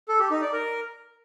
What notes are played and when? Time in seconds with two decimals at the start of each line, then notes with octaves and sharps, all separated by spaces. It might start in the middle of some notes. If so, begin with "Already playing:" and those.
0.08 A4
0.20 G4
0.31 D#4
0.42 D5
0.53 A#4